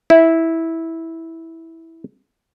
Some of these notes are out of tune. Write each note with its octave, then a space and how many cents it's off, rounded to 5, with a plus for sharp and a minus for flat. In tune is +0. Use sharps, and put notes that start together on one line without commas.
E4 -10